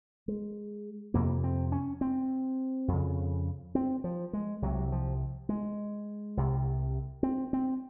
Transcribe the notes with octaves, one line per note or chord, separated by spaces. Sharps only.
G#3
F2 C3 A#3
C4
C#4
C4
F2
C#3
C4
F3
G#3
C2 C3 F#3
F3
G#3
C2 C3
C4
C4